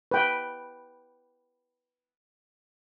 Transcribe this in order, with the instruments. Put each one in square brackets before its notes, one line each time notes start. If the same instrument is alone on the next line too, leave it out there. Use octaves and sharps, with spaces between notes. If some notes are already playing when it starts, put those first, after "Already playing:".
[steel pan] B4 G5